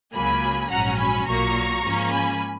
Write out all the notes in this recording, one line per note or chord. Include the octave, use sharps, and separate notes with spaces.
C#2 C#3 F#3 A#3 G#5 B5
A#1 G#2 F#3 C#4 F#5 A#5
G#5 B5
B1 A#2 F#3 A#3 A#5 C#6
G#2 F3 A#3 C#4
G#5 B5